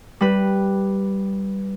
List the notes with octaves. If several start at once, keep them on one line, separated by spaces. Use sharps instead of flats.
G3 B4